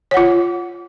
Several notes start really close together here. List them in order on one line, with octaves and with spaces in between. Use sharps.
C#5 F#5 F4